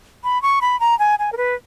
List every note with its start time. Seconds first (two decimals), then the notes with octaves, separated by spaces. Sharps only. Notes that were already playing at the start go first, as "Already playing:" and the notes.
0.24 B5
0.42 C#6
0.61 B5
0.80 A#5
0.99 G#5
1.19 G#5
1.32 A#4
1.37 B4